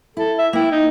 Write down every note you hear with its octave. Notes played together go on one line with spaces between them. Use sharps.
E4 A4
E5
A#3 E4 G5
D#4